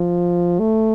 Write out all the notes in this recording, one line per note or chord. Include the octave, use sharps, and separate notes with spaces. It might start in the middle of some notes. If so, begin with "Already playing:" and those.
Already playing: F3
A3